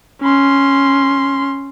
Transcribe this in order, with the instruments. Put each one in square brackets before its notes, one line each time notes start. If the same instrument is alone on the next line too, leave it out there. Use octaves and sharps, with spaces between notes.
[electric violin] C#4 C6